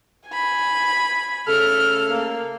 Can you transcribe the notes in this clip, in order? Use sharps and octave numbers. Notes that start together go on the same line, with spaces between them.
G#5 B5
C#3 A3 A4 F6
A#3